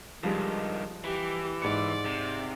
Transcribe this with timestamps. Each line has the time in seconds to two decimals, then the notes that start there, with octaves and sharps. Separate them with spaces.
0.23 G2 D#3 F3 G3 G#3
1.04 E3 G4
1.62 G#2 D5 C#7
2.05 C3